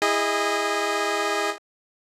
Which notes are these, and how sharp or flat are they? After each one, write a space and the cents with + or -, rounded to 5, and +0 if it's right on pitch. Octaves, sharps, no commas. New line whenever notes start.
E4 +0 G#4 -25 D#5 +0